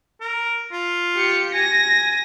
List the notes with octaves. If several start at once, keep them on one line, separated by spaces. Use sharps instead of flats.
A#4
F4
G4 C#7
G#5 A#6